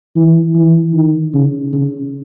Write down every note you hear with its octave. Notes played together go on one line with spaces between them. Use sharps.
E3
E3
D#3
C#3
C#3